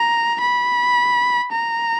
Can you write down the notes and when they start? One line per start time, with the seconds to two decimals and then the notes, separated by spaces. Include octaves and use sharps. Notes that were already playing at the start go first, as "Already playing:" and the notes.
Already playing: A#5
0.41 B5
1.52 A#5